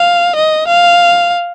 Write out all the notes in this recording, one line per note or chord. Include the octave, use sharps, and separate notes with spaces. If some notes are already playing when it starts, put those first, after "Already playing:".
Already playing: F5
D#5
F5